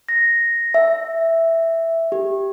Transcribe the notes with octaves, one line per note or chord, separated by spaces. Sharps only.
A#6
E5
G4